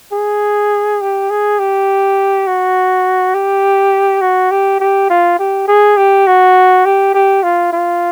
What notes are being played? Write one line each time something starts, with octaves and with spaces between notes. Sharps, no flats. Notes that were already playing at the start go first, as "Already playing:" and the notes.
G#4
G4
G#4
G4
F#4
G4
F#4
G4
G4
F4
G4
G#4
G4
F#4
G4
G4
F4
F4